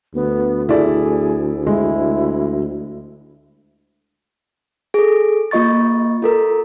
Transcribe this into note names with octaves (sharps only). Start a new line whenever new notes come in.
D2 B3
E4 G#4 A4 D5
G#3 E4
G#4 A4
A#3 F4 D#5 C#6 A6
F4 A4 A#4